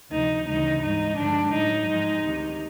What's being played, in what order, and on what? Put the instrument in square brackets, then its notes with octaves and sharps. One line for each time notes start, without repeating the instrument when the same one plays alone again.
[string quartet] D2 C3 F3 D#4
D2 C#3 E3 G3 D#4
G#2 E3 G3 D#4
G2 D3 F3 G#3 D4
A2 F#3 D#4
G#2 F3 G#3
D2 C3 D#3